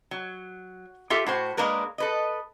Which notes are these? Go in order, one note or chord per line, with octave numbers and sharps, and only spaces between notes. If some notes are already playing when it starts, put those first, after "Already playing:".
F#3
F4 G4 A4 E5
A2 F#4 C5
G#3 A#3 D4 A#4 B4
A4 B4 D#5